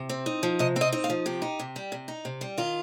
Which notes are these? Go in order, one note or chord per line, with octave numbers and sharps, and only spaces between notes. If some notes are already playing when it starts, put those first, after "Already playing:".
Already playing: C3
C4
D#4
F3
C3 D#5
C4
D#5
D#4
F5
F3
C3 G4
D#4
C3
G3
C3
D#4
C3
G3
D#3 F4